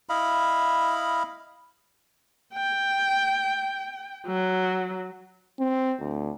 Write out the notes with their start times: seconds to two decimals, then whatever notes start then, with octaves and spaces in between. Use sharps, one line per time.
0.09 E4 D#5 F5 B5
2.54 G5
4.27 F#3
5.59 C4
6.01 D2